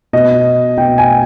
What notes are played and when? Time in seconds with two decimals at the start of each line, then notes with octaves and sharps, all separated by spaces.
0.13 B2 D#5
0.77 B2 G5
0.98 G#5